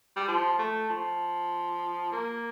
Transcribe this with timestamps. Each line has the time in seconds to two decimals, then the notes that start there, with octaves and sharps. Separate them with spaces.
0.16 G3
0.28 F3
0.59 A3
0.90 F3
2.12 A#3